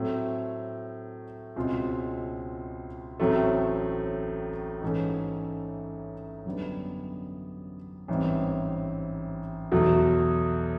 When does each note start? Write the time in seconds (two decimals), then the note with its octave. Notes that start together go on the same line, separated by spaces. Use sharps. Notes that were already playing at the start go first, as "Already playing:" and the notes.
Already playing: A2 F#3 A3 C4
1.56 C#2 B2 G#3 C4 F4
3.19 A1 A2 F#3 A3 C4
4.82 G#2 E3 A3 C#4
6.46 F#2 D3 G3 B3
8.08 A1 G#2 E3 G3 C4
9.72 E2 B2 F#3 A3